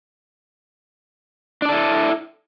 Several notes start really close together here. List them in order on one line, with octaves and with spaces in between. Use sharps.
D4 D5 A4 E4